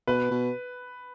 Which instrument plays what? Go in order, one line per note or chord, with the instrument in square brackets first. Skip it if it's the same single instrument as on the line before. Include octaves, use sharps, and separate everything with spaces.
[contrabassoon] B2 [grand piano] B4
[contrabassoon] B2